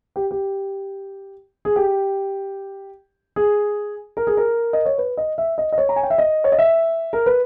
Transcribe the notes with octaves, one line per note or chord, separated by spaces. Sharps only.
G4
G4
G#4
G4
G#4
A#4
G#4
A#4
D#5
C#5
B4
D#5
E5
D#5
D#5
C#5
A#5
G#5
G5
E5
D#5
C#5
D#5
E5
A#4
B4